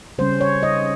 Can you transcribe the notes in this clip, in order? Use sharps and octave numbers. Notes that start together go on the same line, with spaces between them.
C#3 G3 C#4 C5
C#5
D#5